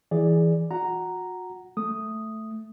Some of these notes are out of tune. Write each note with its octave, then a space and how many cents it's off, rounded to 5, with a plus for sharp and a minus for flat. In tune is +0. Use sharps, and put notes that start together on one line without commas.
E3 +0 G#4 +0 D5 +0
F#4 -35 F#5 +10 A#5 +0
A3 +0 D#6 +0